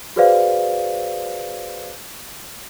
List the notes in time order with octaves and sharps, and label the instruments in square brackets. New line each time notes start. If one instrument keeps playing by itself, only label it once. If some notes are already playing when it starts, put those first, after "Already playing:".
[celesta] F#4 G#4 B4 C5 D5 F5